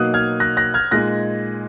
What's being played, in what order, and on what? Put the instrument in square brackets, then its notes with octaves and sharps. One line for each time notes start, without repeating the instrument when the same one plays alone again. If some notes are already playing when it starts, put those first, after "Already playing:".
Already playing: [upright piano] B2 F#3 A#3 D#4 [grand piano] D#6 F#6
[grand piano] F6 G#6
F#6 A#6
F#6 A#6
F6 G#6
[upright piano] A#2 G#3 D#4 [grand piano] F#6 A#6